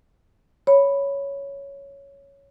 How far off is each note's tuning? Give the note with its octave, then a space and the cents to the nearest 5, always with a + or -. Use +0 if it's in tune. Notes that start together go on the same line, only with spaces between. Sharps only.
C#5 +5 B5 +0